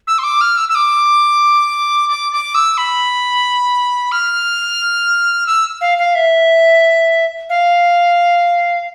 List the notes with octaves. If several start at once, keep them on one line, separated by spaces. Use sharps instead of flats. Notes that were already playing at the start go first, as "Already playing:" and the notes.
E6
C6
D6
F6
E6
E6
D6
D6
D6
E6
B5
F6
E6
F5
F5
E5
F5